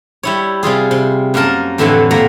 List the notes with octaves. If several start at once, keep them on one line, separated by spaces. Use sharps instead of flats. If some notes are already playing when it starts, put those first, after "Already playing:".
G3 E4 C#5
C3 G3 F4 G#4
C3
F#2 A#3 C#4 A#4 A5
F2 A2 D3 E3 C4 F#5
A#2 A#3 F#5 A#5